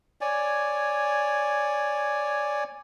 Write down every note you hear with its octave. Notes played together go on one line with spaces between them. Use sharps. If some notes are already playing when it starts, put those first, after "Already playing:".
C#5 D5 G#5